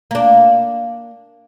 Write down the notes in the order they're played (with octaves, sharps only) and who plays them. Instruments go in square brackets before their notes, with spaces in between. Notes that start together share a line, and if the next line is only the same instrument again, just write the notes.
[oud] A#3 D4